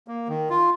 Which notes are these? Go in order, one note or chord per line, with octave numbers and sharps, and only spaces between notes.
A#3
D#3
F4